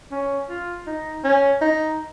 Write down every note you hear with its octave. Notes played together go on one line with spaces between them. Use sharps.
C#4
F4
D#4
C#4
D#4